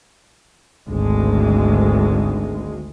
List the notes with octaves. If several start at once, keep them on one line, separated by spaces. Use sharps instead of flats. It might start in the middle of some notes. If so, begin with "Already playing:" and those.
G#1 D2 G#3